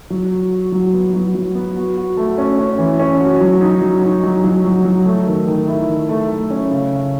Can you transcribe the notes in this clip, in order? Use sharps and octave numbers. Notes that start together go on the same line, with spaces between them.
F#3
F#4
F#4
F#3
B3
F#3
F#3
B3
F#4
F#4
A3
C#4
C#4
E3
C#4
F#4
F#3
D#4
F#3
D#4
F#3
F#3
F#3
F#3
A3
D#3
D#3
E4
D#3
A3
A3
C#4
C#3
C#3